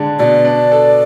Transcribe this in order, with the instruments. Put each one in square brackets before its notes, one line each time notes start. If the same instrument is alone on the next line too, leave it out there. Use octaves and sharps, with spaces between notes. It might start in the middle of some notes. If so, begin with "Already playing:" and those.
Already playing: [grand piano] D3 G#3 D4
[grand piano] B2 [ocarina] D5
[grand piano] D4
A4